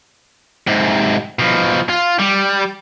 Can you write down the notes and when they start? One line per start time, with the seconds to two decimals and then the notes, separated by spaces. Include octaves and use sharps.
0.67 G#2 C3
1.39 B2 F3
1.89 F4
2.19 G3